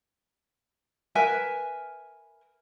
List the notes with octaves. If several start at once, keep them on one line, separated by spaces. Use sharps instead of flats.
A#4 B4 E5 G#5